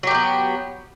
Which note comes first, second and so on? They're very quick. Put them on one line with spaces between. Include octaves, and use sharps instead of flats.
F#3 G4 A3 B3